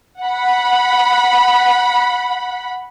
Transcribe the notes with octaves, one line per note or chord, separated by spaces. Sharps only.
F#5 B5